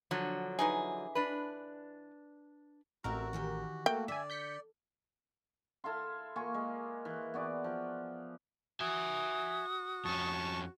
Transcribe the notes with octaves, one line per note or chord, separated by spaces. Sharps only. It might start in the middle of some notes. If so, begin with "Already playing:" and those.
D3 F3 F#3
E3 D#4 G#4
D4 B4
A1 A3 C4 F#4 A#4 E5
D#3 E3 G4
A3 A#3 F#4 G5
D3 D5 E5 G#5
G6 B6 C#7
E4 A4 F5 C6
A#3 F4 G#5 C#6
G#3
E3
B3 F#4 D5
F3
F#4 E5 G#5 D#6
F2 C#4 A5 C#6